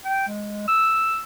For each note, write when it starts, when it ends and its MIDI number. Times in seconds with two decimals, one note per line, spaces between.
0.05 0.27 79
0.27 0.66 56
0.68 1.23 88